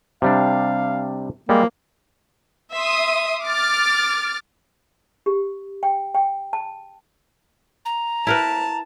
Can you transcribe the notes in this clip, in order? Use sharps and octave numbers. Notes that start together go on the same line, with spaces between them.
C3 G3 D4 F5
G3 G#3 A#3
E5 C6 D#6
D6 F6 A6
G4
G5
G5
A5
A#5
E4 A#4 B4 A5